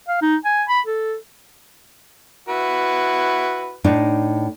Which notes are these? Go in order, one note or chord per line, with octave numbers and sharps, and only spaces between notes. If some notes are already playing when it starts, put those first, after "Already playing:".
F5
D#4
G#5
B5
A4
E4 F#4 B4
A2 D4 D#4